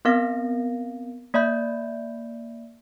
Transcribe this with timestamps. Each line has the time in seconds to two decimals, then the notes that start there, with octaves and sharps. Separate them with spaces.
0.05 B3 C4 A#4 F5 A#6
1.34 A#3 D5 E5 B5 G6